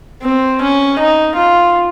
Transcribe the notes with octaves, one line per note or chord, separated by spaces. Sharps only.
C4
C#4
D#4
F4